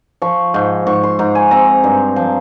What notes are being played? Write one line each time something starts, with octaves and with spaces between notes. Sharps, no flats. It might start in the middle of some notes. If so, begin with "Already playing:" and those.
F3 C#6
G#2
G#2 C#6
C6
G#2 A#5
G#5
C4 A#5
G2
F3